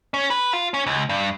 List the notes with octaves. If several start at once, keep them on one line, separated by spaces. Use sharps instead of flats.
C#4
B4
F4
C#4
C#2
G2